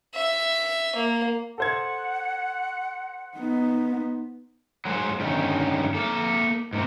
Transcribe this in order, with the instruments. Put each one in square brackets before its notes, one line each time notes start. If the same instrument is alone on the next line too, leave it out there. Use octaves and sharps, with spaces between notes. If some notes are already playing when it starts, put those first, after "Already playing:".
[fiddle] E5
A#3
[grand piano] A4 C5 G#6 [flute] F#5
[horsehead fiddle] B3 D#4
[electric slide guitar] F#3 G#3 B4 C5
G2 D3 D#3 C#4 D#4
A#3 A4
G#2 A#3 C4